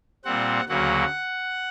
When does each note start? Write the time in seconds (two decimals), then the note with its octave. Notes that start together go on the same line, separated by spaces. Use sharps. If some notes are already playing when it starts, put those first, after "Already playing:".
0.25 A#2 G3 C4 F#5
0.69 D2 C#3 F#3 A#3 F#5